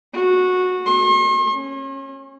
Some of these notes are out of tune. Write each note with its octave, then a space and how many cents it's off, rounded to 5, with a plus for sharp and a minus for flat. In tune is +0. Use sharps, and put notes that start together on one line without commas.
F#4 -15
C6 +45
C#4 -25